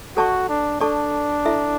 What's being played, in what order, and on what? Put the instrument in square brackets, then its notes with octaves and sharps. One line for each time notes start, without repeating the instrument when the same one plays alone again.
[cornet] F#4 [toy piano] A4 D5 A5 C#6
[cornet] D4
[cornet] D4 [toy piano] A4 D5 A5 C#6
[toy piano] E4 A4 E5